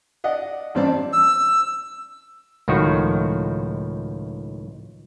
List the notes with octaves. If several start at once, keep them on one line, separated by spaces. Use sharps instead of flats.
D5 D#5 F#5
A1 G2 C4 D5 A5
E6
C#2 A2 D#3 F3 F#4